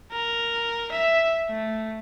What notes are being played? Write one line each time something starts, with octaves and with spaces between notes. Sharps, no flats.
A#4
E5
A3